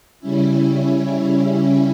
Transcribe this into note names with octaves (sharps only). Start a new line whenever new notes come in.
C#3 G3 C#4 E4